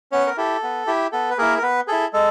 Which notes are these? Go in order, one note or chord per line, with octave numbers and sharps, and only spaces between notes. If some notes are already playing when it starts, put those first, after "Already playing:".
B3 C#4 C#5
A#4
E4 G4 A4
B3
E4 G4
B3 A4
B4
A#3 E4 G#4 A#4
A#4
B3 B4
E4 G#4 A4
G#3 A4